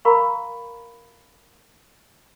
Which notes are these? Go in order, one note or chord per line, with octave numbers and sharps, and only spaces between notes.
A#4 F5 A#5 B5 C#6